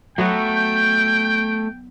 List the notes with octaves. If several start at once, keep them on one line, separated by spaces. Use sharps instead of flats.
F#3 A3 B3 F#4 G5
G6